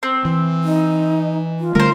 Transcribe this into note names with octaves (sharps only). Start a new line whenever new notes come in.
C4
E3
D#4
F4
D3 G3 A3 A#4 C5